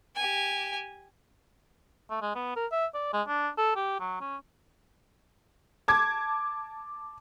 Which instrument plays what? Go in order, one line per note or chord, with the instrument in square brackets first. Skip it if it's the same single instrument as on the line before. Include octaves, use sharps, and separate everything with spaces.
[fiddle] G4 G#5
[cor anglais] A3
G#3
B3
A#4
E5
D5
G#3
D4
A4
G4
F#3
C#4
[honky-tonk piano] A5 D6 G#6